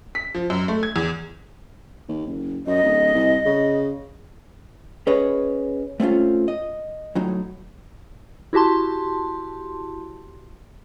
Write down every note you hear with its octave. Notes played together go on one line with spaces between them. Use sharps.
B6
F3
F#2
A3
G#6
E2
D#2
F#1
F#2 D#5
D1
C2
C#3
C#4 G#4 B4 C#5 D#5
A3 C4 C#4 F4
D#5
A2 F#3 D#4
E4 F#4 G4 A5 C6